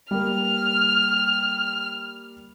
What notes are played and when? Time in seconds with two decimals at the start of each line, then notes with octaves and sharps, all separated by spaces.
0.11 G3 A#3 F6